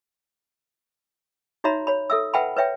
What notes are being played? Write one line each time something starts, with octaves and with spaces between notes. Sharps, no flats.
D#4 F#4 C#5 E5 A#5 B5
C#5 B5
A4 E5 E6
B4 E5 F#5 G5 A5 B5
B4 C#5 E5 G5